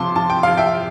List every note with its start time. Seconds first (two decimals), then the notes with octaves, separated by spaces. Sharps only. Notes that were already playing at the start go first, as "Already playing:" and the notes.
Already playing: C3 F3 A5 C6 D6
0.16 F3 A5
0.30 G5
0.43 F3 F5
0.57 E5 G5